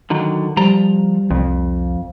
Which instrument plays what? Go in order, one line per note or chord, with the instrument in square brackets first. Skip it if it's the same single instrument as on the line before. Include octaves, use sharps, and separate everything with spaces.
[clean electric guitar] D3 D#3 F#3
[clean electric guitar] F3 A#5 [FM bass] G3
[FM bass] C2 [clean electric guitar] F2